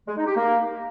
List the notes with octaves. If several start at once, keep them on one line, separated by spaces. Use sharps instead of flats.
G#3
D#4
G4
A#3